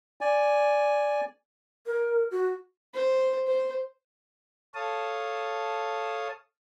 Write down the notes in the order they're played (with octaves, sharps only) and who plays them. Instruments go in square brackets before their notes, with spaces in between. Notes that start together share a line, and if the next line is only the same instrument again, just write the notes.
[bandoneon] D5 G#5
[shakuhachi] A#4
F#4
[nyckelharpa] C5
C5
[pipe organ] A4 C#5 F5 A5 D#6